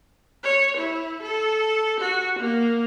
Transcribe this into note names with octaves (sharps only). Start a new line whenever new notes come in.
C#5
E4
A4
F#4
A#3